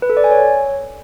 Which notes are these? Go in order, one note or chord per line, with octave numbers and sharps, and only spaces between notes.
B4
A4
D5
G#5
C#5